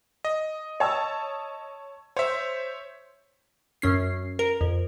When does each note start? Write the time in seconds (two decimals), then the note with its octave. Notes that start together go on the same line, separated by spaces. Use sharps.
0.25 D#5
0.80 C#5 A5 E6
2.17 C5 C#5 E5
3.82 F#2 C#4 C7
4.39 A#4
4.61 F2